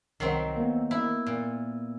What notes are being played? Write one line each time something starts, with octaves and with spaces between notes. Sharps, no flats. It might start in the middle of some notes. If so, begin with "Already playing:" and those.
C2 D#3 F#3 C4 C7
A#3 B3
E4
A#2